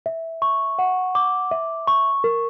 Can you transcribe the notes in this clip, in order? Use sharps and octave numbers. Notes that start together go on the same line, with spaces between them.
E5
C#6
F#5
D6
E5
C#6
A#4